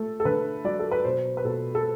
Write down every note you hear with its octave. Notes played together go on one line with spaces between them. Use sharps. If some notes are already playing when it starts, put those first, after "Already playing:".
Already playing: A3 A4
A4
D3 B4
F#3 D5
A4
B4
B2 C5
B4
B2 A4
A4